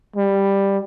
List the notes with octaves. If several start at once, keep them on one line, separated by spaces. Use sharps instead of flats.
G3